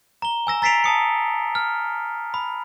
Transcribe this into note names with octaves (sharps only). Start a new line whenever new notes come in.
A#5 G7
G#5 E6 A#6 E7
A#5 A6 B6 C7 D7 F7
A5 D#6 C#7
F6
B5